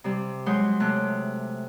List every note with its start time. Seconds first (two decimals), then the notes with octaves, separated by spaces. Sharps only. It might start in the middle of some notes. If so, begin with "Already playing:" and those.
0.04 C3 G3
0.46 F#3 G#3 C#5 C6 G6
0.80 C3 A3 F#6